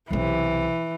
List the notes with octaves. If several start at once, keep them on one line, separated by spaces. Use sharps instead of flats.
B1 C3 E3